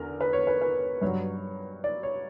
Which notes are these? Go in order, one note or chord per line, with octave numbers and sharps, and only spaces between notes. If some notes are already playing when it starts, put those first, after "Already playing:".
Already playing: E2 D3 A#4
B4
C#5
B4
B4
G2 F#3 C#5
D5
C#5